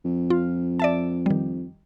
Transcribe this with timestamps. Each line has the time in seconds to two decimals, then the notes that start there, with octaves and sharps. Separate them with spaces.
0.05 F2
0.30 F4
0.80 D5 E5 A5
1.26 D#3 G3